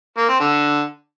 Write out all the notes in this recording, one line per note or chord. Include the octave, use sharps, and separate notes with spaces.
A#3
C4
D3